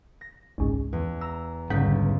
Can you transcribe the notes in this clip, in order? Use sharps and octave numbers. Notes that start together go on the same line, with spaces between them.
A#6
G#1 C#2 G#2
E2
A#5 E6
C#2 G#2 D3 G3 F#5 G6 B6